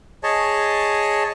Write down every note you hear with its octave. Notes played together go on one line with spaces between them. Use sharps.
G#4 C#5 D#5 A5